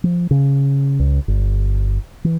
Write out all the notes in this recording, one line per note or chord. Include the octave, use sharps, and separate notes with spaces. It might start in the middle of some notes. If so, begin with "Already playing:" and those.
F3
C#3
C#2
G1
E3